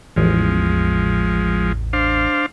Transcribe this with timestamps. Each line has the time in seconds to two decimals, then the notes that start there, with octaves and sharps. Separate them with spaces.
0.16 A1 E2 F3 G#3
1.93 D4 C5 F5